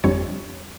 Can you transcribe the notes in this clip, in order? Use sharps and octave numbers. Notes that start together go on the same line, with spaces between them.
G1 F2 D3 G3 C#5